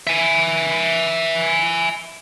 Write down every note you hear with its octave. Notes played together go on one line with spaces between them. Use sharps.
E5 G#5